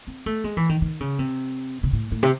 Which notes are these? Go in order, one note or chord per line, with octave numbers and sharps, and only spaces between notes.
C4
A3
G#3
E3
D#3
D#3
C#3
C3
C3
A2
A2
C3